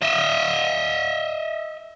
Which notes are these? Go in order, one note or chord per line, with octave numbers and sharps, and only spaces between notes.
D#5 E5